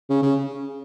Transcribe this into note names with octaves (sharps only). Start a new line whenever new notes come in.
C#3
C#3